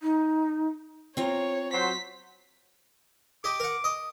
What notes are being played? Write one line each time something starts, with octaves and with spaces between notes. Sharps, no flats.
D#4
C4 F4 C#5 A#5
F#3 C5 B6
G4 D#5 D6
A#4 F#5
D#5